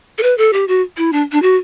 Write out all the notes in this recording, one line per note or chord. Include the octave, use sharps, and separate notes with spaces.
A4
B4
A4
G4
F#4
E4
D4
D4
F#4